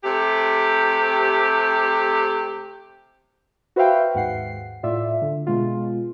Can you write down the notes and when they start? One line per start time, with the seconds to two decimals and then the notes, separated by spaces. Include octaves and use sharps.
0.04 C3 A3 G4
3.76 F#4 B4 C5 E5 F5 G5
4.14 D#2 G#2 F#5 C7
4.83 A2 F4 D5 E5
5.22 D3
5.47 B2 G#3 F4